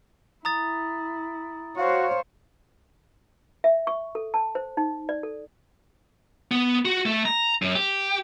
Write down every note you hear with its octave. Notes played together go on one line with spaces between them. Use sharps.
E4 A#5 D#6 A6
F#4 C5 C#5 F5
E5
C#6
A4
A5
C5
D#4
D5
A4
B3
F#4
A3
A#5
F#2
G4